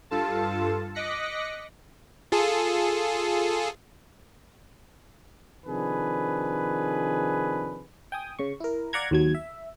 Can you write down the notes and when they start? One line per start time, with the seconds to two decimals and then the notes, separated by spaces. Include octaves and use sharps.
0.11 G2 F4 A4 A5
0.95 D#5 D6 F#6 A#6 B6 C#7
2.32 F4 G#4 A4
5.66 C3 D#3 F3 D4 G#4 B4
8.12 G5 G#5 D#6
8.39 C#3 C#6
8.60 E4 A#4
8.93 D5 F5 F#5 A#5 G#6
9.11 D#2 F#3 G#6
9.34 E5